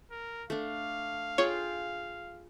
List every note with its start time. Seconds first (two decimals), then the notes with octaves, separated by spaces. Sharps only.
0.11 A#4
0.50 A3 D4 F5
1.38 F4 G#4 C#5 G5